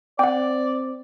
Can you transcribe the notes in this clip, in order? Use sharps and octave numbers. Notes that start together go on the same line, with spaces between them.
C4 D5 F#5 G5